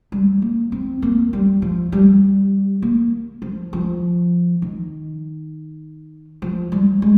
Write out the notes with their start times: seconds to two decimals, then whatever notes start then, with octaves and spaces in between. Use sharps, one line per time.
0.12 G3
0.42 A#3
0.72 C4
1.02 A#3
1.33 G3
1.62 F3
1.92 G3
2.82 A#3
3.42 F3
3.73 F3
4.62 D#3
6.42 F3
6.72 G3
7.02 G#3